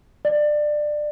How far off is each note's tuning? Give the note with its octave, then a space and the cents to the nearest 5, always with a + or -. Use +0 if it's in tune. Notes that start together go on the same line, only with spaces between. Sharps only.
D5 +20